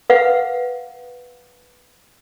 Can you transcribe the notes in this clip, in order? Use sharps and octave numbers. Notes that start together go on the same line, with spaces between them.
B4 F5 F#5